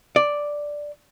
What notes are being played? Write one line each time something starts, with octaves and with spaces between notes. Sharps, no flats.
D5